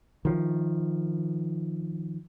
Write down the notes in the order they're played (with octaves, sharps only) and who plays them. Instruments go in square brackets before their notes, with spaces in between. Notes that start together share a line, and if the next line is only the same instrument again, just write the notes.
[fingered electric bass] D#3 F3